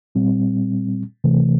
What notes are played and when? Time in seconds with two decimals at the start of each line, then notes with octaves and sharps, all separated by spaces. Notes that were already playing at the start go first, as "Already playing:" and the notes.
0.15 A#2 G3 C4
1.24 C3 E3 A3